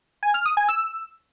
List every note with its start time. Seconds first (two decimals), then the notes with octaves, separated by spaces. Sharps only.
0.23 G#5
0.34 F6
0.46 D#6
0.57 G#5
0.68 E6